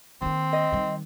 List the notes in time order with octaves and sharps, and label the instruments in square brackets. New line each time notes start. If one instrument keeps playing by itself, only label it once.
[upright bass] D#3 A#3 [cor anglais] C4
[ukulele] D#5
[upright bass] D#3 G3